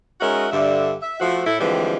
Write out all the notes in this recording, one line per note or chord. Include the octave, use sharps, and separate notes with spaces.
G#3 C#4 D#4 F#4 A#4 E5
G2 D3 E5
E5
F3 A3 F#4
A2 E4 A4
D3 E3 F3 G3 G#3 C4